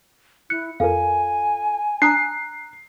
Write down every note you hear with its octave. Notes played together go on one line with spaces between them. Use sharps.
E4 F#6 C#7
F2 F4 A4 A#4 F5 G#5
D4 A5 A#5 D#6 F#6 C7